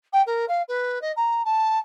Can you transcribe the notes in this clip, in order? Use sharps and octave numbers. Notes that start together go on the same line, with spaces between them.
G5
A#4
F5
B4
D#5
A#5
A5